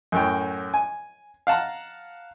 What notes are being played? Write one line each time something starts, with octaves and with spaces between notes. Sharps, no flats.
F#2 A2 G5
G#5
F5 F#5 A5 A#5